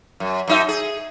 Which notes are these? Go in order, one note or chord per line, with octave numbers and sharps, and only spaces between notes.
F#2
F#2 D#4 E5
G#4